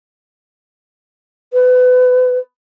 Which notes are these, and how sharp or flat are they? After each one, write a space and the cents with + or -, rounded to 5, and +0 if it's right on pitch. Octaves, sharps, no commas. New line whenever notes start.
B4 +30